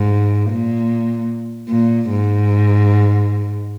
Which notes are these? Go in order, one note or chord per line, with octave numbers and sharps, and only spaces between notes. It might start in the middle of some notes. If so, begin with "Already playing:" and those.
Already playing: G#2
A#2
A#2
G#2